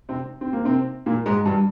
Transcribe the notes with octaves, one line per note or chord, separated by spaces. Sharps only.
C3 C4
C4
A#3
C3 C4
A#2 A#3
G#2 G#3
G2 G3